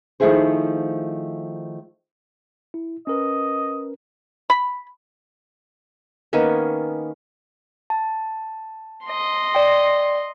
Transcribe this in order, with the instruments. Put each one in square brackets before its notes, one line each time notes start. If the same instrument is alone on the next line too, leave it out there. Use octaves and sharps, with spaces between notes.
[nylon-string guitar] D#3 F3 A3 E4 G#4 C5
[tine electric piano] E4
[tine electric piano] C#4 A#4 B4 [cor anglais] D#5
[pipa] B5
[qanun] D#3 A#3 B3 C#4
[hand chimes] A5
[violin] D#5 C6
[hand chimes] D5 G5